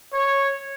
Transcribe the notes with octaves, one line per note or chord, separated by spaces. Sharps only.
C#5